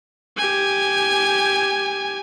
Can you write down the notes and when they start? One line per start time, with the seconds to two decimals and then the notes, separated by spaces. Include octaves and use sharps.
0.37 G4 G#5